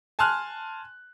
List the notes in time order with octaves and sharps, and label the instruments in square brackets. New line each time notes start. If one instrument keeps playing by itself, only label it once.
[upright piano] G#5 A5 C6 F6 F#6